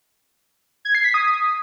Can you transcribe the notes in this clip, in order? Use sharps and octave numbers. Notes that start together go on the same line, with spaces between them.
G#6
C7
B6
D#6